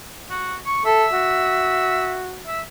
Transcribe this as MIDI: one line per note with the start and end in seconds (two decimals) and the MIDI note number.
0.30 0.55 66
0.66 0.82 85
0.85 1.06 69
0.85 2.24 76
1.13 2.44 66
2.47 2.60 76